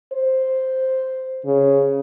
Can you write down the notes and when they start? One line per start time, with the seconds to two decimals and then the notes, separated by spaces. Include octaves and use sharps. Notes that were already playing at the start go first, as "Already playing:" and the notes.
0.13 C5
1.45 C#3